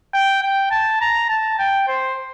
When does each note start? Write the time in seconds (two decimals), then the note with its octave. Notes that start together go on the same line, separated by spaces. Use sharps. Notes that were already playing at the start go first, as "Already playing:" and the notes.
0.14 G5
0.43 G5
0.71 A5
1.01 A#5
1.29 A5
1.59 G5
1.88 C5